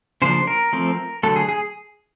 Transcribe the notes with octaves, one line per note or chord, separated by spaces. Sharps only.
C#3 F3 A#3 D4 C5
A#4
F3 A3 C4
D3 F#3 A3 A4
G#4
G#4